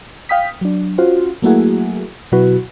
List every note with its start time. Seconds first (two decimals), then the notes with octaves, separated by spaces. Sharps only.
0.29 F5 G5 D#6 B6
0.61 F#3 D4
0.98 C#4 F4 F#4 C5
1.42 F#3 A3 A#3 E4 F#4 G#4
2.32 B2 F#3 E4 F#4 B4